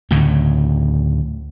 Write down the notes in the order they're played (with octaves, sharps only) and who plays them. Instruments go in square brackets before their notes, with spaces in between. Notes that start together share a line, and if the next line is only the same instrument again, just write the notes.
[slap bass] D2 A2 C#3